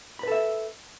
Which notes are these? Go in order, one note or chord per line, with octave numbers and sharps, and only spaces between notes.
A4 B4 E5 B5